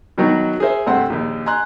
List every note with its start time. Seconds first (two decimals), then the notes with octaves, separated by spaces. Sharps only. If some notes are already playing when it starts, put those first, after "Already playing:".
0.18 B2 D#3 F#3 D#4 F#4
0.60 G#4 A#4 C5 E5
0.87 G2 C3 A3 C4 F#5 C6
1.10 A#1 D#2
1.46 G#5 A#5 C6 F#6